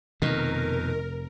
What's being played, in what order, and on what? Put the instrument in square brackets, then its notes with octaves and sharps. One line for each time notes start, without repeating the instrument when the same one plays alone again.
[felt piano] F1 A#6 [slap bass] F2 B2 [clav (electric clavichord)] D#3 [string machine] A#4